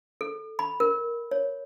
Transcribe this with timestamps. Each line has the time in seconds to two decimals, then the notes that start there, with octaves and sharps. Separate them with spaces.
0.21 A4
0.59 B5
0.80 A#4
1.31 C#5